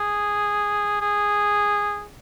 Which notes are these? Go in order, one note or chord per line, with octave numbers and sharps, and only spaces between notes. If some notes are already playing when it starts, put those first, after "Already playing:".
Already playing: G#4
G#4